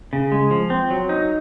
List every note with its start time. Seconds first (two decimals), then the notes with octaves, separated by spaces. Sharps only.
0.13 C#3
0.32 G#3
0.51 F3
0.70 C4
0.91 F#3
1.09 D#4